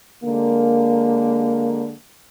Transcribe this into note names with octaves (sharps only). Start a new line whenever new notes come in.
D3 G#3 A#3